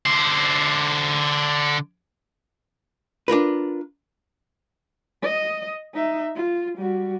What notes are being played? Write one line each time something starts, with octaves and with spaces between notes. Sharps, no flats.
D3 C5
D4 F4 A#4 B4
D#5
D#4 E5
F4
G3 F#4